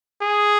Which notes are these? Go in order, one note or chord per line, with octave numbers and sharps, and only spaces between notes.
G#4